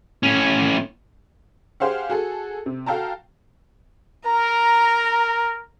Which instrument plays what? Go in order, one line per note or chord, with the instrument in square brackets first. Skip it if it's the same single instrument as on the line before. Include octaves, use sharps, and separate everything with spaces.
[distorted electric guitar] A2 C#4
[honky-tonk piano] G4 G#4 C5 F5 F#5
F#4 G#4 A4
C3
F#4 A4 F5 G5 A5 A#5
[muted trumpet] A#4 [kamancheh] A#5